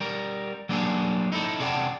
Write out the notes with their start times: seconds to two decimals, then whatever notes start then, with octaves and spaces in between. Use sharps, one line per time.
0.01 G3 A#4
0.69 F#3 G3 A#3 D4 G#4 A4
1.32 D#4 E4 A4
1.59 C3 G#4 D5 F#5 G5 A5